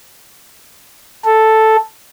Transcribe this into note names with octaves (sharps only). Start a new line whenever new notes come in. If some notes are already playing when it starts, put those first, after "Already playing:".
A4